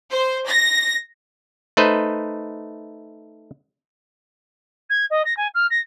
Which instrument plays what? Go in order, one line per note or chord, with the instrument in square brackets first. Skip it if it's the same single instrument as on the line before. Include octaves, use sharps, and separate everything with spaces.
[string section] C5
A#6
[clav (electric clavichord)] A3 D#4 B4 C5 D#5
[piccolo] G#6
D#5
A#6
G#5
F6
A#6